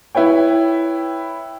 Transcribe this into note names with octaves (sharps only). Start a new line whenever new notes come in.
E4 B4 C#5 G5